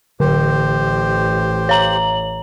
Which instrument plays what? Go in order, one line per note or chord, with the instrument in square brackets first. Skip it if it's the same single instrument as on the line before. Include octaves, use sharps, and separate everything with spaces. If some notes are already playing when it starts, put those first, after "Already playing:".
[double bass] A1 [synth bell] D3 [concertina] G4 C5
[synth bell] C#5 A#5 F#7